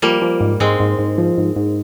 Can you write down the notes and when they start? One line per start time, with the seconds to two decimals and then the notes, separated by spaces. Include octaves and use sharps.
0.02 F3 G3 A#3
0.22 F3
0.41 G#2
0.60 G#2 G#3 C4
0.80 G#2
0.99 G#2
1.18 F3
1.38 G#2
1.56 G#2